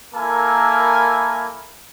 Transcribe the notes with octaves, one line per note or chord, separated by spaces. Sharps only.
A#3 E4 A4 A#4 G#5